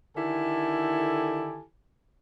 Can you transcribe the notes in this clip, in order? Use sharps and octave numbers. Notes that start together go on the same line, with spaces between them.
D3 D#3 E4 G4 A4 G#5